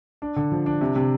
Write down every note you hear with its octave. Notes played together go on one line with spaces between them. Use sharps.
D4
D3
F3
D4
C3
C3